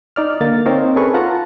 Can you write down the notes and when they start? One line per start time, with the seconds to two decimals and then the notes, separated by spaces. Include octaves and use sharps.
0.16 D#4 D5 F6
0.41 D3 A#3 A6
0.66 C4 D#4 A#4 C5 C#5
0.96 C#4 G#4 A4 B4 C#6
1.14 F4 F#5 A5 A#5